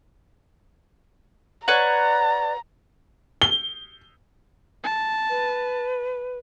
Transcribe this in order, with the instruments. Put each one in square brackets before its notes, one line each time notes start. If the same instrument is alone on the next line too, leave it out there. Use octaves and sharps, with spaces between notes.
[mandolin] B4 C#5 F#5 [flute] D5 [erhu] A#5
[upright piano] G7
[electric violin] A5
[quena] B4